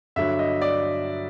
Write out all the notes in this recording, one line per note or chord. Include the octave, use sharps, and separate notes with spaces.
G2 D3 F#3 E5
D#5
D5